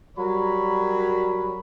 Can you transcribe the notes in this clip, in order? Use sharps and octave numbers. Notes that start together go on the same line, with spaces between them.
F#3 G3 F#4 A#4 C#5 B5